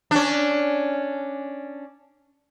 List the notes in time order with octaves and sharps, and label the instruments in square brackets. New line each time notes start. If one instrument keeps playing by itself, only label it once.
[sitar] C#4 D4